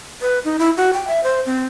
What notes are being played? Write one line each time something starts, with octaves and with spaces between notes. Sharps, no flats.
B4
D#4
E4
F#4
G5
E5
C5
C4